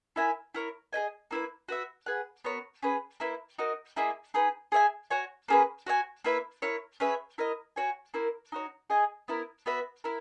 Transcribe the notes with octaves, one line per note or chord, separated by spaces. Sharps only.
E4 A#4 E5 G#5
E4 A#4 C#5
G#4 B4 D#5 G#5
A#3 E4 B4
F#4 B4 E5
G#4 B4 F#5
B3 F#4 A#4 C#5
C#4 G#4 B4
A#3 E4 B4
D#4 F#4 A#4 D#5
A#3 E4 G#4 D#5
D#4 G#4 B4
G#4 C#5 E5 G#5
F#4 C#5 G#5
A#3 C#4 G#4 B4
F#4 C#5 E5 G#5
A#3 E4 B4 E5
E4 A#4 C#5
C#4 G#4 B4 E5
E4 A#4 D#5
F#4 C#5 G#5
A#3 E4 A#4
D#4 F#4 C#5
G#4 D#5 G#5
B3 E4 A#4
B3 F#4 B4 E5
E4 A#4